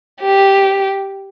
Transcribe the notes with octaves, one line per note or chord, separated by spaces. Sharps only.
G4